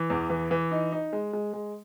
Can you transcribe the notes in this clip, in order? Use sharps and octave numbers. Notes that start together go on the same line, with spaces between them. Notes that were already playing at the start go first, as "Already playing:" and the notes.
Already playing: E3
E2
E3
E3
D#4
D#4
G#3
G#3
G#3